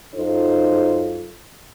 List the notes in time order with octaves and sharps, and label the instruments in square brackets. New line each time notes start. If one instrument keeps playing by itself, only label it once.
[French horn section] F#2 D#4 F4 A4 C5